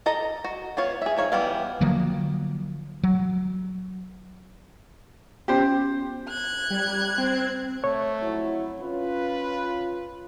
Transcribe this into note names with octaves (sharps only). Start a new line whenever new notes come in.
A4 D#5 A#5
F#4
B3 F4 C#5 F5
G#4 E5
F3 D#4 C#5 F5
E3 G3 B3 F5
D3 F3 F#3 A#3
F#3
B3 C#4 F4 G4 C5
F#6 G#6
G3
C4
A3 C#5
F2 F#3 E4
C#4 F4 B4